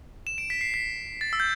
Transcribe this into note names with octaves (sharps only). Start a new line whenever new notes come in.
E7
D7
B6
C7
B6
A6
E6
G6